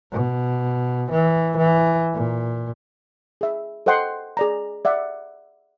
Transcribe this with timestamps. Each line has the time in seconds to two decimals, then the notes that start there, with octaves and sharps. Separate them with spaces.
0.12 B2
1.11 E3
1.57 E3
2.13 A#2
3.41 G#4 E5
3.86 A4 C5 D#5 F#5 G5 C6
4.37 G#4 D5 A#5
4.85 D5 E5 F#5